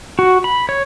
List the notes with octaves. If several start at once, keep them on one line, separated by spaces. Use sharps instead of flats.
F#4
B5
C#5